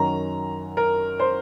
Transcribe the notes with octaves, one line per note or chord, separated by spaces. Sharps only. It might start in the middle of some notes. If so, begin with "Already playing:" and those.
Already playing: F#2 D#3 F#3 C#4 A#5
A#4
C5